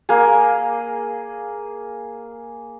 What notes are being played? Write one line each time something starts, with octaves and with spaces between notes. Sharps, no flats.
A#3 G#4